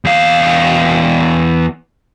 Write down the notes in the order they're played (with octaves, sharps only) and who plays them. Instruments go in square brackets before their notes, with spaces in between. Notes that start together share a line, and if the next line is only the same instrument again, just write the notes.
[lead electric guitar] E2 F5